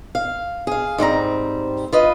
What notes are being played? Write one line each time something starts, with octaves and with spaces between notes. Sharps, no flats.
F5
G#4 F5
G#2 G3 C4 A#5
F4 B4 D#5